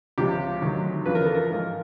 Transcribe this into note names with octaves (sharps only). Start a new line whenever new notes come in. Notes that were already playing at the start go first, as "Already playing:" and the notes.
C#2 C3 F3 G4
D2 C3 D#3 F#3
E2 C#3 F3 B4
A#4
A4
A#4
G#2 F3